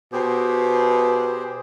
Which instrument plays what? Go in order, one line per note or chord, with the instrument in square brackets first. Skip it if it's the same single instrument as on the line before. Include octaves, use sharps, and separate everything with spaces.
[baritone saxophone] B2 [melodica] G4 G#4 C5